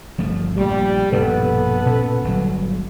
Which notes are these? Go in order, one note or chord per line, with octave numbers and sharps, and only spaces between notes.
G1 F3 A3
A#1 G3
A#1 G2 B2 B3 A4 B4
A#2 C#4
G1 F#3